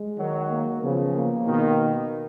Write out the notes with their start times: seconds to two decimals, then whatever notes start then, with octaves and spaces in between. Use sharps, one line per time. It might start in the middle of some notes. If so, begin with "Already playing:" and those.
Already playing: G#3
0.17 D#3 F#3
0.49 A#3
0.81 C#3 F3 B3
1.14 A#3
1.45 B2 D#3